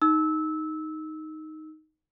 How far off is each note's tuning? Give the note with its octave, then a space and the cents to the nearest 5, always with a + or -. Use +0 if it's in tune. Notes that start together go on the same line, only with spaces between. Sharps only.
D#4 +0 E6 -20